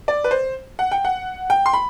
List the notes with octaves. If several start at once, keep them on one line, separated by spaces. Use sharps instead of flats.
D5
B4
C5
F#5
G5
F#5
G5
C6
B5